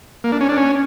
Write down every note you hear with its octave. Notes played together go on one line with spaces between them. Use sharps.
A#3
D4
C#4
D4
C#4